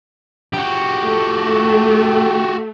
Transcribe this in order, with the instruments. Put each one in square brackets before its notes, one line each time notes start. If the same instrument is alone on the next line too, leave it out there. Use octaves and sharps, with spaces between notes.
[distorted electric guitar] F#4 G4
[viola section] A3